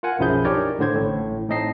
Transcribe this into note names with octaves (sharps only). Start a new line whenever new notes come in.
F4 A#4 F#5 G#5
B1 F#2 F3 E4 G#4 G6
D4 D#4 G4 A#4 C#5 D5
A2 D3 C5 G#6
A1 A2
A2 C4 D#4 D#5 A5 C7